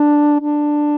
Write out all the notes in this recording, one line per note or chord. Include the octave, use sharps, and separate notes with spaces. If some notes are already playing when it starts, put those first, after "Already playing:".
Already playing: D4
D4